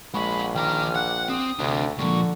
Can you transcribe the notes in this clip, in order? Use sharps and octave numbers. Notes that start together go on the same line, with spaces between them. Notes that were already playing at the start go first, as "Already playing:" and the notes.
A#1 G#3 F#5 B5 C#6
D#3 G5 A#5 D6 F6
F#5 F#6
C4 D#6
D2 C3 D4
D#2 A#2 D3 F3 G#3 C#6